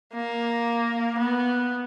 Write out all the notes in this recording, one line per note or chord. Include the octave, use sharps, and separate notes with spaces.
A#3
B3